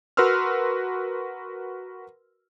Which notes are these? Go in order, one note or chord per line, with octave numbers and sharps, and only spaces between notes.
F#4 A#4 B4 C6 E6 F6